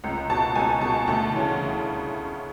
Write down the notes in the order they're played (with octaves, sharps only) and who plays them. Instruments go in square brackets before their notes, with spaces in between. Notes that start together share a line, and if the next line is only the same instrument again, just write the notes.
[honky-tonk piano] C#2
B2 A5
C#2 G#5
B2 A5
D2 A5
C#3 E3